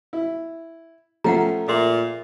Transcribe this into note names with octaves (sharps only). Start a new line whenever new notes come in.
E4
F3 A3 C#4 F#5 G5 A#5
A#2 G#4 E5 C6